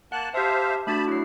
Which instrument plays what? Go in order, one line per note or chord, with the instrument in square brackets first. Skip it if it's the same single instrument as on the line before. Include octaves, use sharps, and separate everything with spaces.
[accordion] A#3 A5 F#6 [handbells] F#5
[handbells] G4 A5 [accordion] C5 E5 F5
[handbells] A3 D4 F#4 [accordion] A5 B5
[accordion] F#3 [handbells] E4 C7